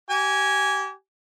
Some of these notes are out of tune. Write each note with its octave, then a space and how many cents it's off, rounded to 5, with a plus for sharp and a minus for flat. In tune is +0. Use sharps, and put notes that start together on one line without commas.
G4 -30 G#5 -5